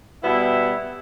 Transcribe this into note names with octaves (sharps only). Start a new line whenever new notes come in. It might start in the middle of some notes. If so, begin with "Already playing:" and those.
B2 G3 B3 E4